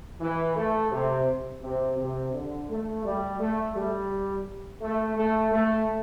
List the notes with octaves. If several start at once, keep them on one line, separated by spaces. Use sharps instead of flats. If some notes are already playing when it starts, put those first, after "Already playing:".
E3
A3
C3
C3
C3
D3
A3
G3
A3
G3
A3
A3
A3